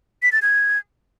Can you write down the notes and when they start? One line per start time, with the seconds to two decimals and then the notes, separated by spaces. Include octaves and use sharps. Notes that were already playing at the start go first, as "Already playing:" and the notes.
0.23 B6
0.32 A6
0.42 G#6